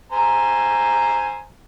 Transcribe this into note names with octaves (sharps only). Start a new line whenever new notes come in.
C5 G#5 A#5